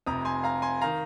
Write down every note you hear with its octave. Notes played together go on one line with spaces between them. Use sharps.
F1 F2 C3 A#5 D#6
G#5 C6
F5 A#5
G#5 C6
D#3 F5 A#5